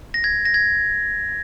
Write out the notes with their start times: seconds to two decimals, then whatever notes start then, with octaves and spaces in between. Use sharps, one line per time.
0.14 A#6
0.24 G#6
0.45 A#6
0.54 G#6